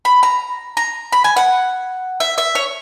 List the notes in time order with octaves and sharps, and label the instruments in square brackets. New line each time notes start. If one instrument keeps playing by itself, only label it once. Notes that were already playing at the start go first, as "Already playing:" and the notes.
[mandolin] B5
A#5
A#5
B5
G#5
F#5
E5
E5
C#5